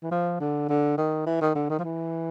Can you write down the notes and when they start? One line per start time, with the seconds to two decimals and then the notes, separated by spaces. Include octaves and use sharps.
0.03 E3
0.11 F3
0.40 D3
0.69 D3
0.98 D#3
1.26 E3
1.41 D#3
1.55 D3
1.70 D#3
1.79 F3
1.84 E3